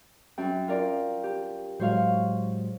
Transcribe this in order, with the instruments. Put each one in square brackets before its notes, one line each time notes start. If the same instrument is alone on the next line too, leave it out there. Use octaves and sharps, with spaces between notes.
[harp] F#2 [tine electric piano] G5
[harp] F4 A#4 D5
G4
[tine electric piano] A2 F#3 G#3 [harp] C5 C#5 F5